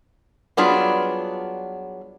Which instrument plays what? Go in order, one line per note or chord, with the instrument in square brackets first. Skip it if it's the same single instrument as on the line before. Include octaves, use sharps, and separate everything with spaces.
[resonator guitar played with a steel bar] F#3 G3 B3 D4 F4 G#4